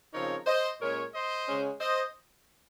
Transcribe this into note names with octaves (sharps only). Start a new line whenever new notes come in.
C#3 F3 C4 D#4 A#4 C#5
C5 D#5
A#2 G#3 C#4 A#4 C#5
C5 D#5
C#3 G#3 C#4
C5 D#5